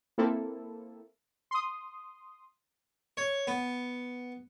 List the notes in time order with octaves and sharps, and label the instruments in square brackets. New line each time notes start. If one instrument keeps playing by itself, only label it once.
[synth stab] A#3 C4 E4 A4
C6 D#6
[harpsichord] C#5
B3